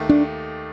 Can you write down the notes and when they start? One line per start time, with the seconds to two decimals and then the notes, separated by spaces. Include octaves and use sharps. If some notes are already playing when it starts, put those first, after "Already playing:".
Already playing: D#2 D#3 A3 D#4
0.09 D4